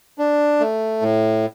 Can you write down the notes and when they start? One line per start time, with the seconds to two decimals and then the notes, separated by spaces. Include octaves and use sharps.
0.19 D4
0.60 A3
1.02 A2